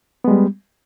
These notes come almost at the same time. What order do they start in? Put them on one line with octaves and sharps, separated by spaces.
B3 G#3 G3